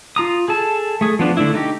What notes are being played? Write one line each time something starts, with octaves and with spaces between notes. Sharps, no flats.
F4 A#5 D#6
G#4 A4 A5
A3 G#4
F3 B3 D4
D3 A3 D4 E4
A3 D#4 G4